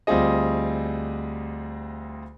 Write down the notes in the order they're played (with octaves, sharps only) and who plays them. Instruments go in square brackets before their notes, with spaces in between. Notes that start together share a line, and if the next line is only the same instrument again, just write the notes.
[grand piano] D2 G3 C4 F4 G#4 D#5